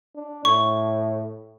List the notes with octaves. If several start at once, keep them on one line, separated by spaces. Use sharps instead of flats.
D4
A2 C#6